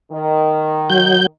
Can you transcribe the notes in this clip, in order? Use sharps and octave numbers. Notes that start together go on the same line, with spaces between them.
D#3
F#3 G6